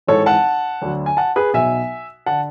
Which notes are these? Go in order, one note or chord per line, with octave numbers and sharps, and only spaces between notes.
G#1 G#2 E3 A4 C#5
F#5 A5
D2 D3 F#3
G#5
F#5 A5
G#4 B4
B1 B2 F#3 E5 G#5
D3 F#5 A5